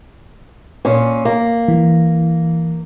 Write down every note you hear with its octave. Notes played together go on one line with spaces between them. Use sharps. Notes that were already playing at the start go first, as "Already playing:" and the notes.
A#2 C#4
A#3
E3